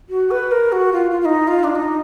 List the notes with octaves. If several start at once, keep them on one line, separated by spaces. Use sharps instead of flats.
F#4
B4
A#4
F#4
F4
F4
F4
D#4
F4
D4
D#4